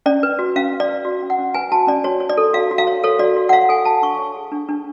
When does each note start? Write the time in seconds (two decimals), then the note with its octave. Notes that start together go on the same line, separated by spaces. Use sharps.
0.06 C#4 D5
0.23 B4
0.39 F#4
0.56 C#4 F5
0.73 C#4
0.80 D5
0.88 B4
1.05 F#4
1.22 C#4
1.30 F#5
1.38 C#4
1.54 B4 G#5
1.72 F#4 A5
1.87 C#4 D5
2.04 F#4 C#5
2.20 C#5
2.30 D5
2.37 A4
2.53 F#4 F5
2.71 F#4
2.78 F5
2.87 C#5
3.04 A4 C#5
3.19 F#4 D5
3.36 F#4
3.49 F#5
3.53 C#5 F5
3.69 A4 G#5
3.85 F#4 A5
4.02 D4 C#6
4.19 C#5
4.36 G#4
4.52 D4
4.69 D4